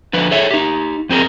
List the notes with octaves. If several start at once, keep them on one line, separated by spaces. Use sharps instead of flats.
D3 F3 B4
G#4 A4 C#5 E5
D#4 G4
F2 C4 G#4 A#4